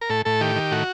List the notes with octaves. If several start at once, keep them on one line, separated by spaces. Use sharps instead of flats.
A#4
A2 A4
A2 A4
D#3 G4
D#3
A2 F#4